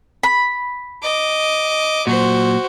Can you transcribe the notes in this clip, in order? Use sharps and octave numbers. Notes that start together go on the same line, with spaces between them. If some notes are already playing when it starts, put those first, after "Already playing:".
B5
D#5 D6
A#2 F#3 F#4 C5